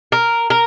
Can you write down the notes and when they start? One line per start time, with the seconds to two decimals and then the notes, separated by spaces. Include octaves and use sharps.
0.12 A#4
0.50 A#4